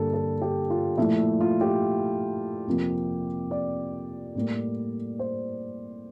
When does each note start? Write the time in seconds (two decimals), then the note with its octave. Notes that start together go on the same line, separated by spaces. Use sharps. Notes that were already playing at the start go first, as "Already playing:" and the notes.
Already playing: G2 D3 G3 A#3 A4
0.14 A4
0.42 G4
0.70 F4
0.97 A#2 F3 A3 E4
1.41 F4
1.61 G4
2.67 F2 C3 F3 A#3
3.51 D5
4.35 A2 G3 A#3
5.19 C5